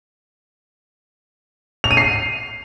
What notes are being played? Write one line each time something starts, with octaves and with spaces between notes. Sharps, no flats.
F7
D#7
C7